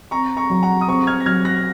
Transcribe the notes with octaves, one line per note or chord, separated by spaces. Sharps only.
C4 A#5 C#6
A#5 C#6
F#3
F#5 A#5
D#6
C4 A#5 C#6
F6 G#6
A#6
F#3 F6 G#6
F#6 A#6